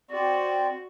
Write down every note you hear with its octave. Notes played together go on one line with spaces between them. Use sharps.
C4 F#4 D5